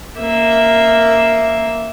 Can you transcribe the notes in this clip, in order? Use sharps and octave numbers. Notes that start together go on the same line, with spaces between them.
A#3 E5